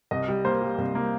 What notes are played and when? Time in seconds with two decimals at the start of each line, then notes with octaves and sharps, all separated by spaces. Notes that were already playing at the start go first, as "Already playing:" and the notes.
0.11 C2 D#5
0.28 G3
0.45 A#3 C5
0.62 G3
0.78 C2
0.95 A#3